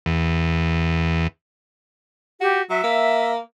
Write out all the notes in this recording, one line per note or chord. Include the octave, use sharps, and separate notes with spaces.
E2
F#4 G4
F#3 E5
A#3